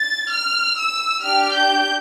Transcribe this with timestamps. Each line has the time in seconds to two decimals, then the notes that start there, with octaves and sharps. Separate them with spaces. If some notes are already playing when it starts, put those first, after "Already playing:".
Already playing: A6
0.31 F6
0.78 E6
1.23 D4 G4 F6
1.54 G6